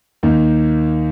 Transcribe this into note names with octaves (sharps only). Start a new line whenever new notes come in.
D#2 D#3 A#3 D#4